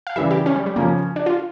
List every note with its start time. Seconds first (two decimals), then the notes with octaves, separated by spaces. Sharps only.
0.07 F5
0.16 C#3 E3 G3 E5
0.31 G4
0.46 C#4
0.56 G3
0.66 G3
0.76 C#3 F3 A#3 C#4
1.16 D4
1.26 F4